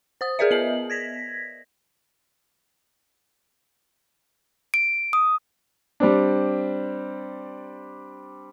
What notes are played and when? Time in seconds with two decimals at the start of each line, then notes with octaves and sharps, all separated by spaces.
0.21 C5 D#6
0.39 G#4 A#4 B4 D5 E5
0.51 B3 D#5 F#7
0.90 G#6 A#6 B6
4.74 D7
5.13 D#6
6.00 G3 C4 D4